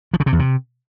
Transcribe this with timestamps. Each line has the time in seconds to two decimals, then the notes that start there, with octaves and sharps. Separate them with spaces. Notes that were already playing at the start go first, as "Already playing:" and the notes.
0.14 F3
0.20 C#3
0.26 C3
0.33 E2
0.39 C3